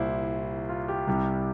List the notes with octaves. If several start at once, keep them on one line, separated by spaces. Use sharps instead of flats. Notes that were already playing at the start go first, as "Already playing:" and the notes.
Already playing: C2 A#2 G3 E4 C5
F4
G4
C2 C3 G3